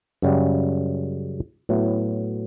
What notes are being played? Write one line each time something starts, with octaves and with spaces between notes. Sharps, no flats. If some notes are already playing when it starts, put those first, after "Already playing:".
F#2 C#3 G3
A2 F#3 B3 E4